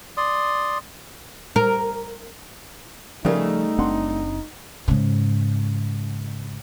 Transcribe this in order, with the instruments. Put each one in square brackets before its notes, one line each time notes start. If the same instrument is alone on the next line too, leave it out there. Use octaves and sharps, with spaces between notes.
[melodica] D5 C6 D#6
[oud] A#4
[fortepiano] C#3 G#4 A#4 [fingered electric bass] F3 [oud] G3 A3 [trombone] D#4
[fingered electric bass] F#1 C4 D4 [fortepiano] F#5 C6
[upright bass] G#2 C#3